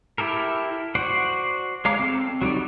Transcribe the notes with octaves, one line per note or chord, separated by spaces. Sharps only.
E4 G4 A4 A#4
F#4 C5 D5 F#5
G#3 C#5 F5 A#5 D6
C4 A4
F#3 G3 D#4 D5